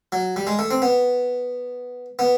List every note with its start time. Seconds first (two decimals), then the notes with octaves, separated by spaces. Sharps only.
0.12 F#3
0.36 G3
0.47 G#3
0.59 A3
0.71 C4
0.82 B3
2.19 B3